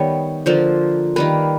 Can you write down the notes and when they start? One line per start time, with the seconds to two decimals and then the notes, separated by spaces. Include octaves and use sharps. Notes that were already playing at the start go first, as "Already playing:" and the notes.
Already playing: D#3 G3 B3 C#5
0.46 D3 F3 A#3 C5
1.16 D#3 G3 A#3 B4